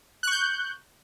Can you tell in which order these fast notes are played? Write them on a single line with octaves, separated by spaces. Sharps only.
F#6 C#6 G6